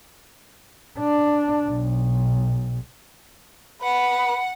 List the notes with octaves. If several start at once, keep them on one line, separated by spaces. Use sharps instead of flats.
D4
B1
B4 F#5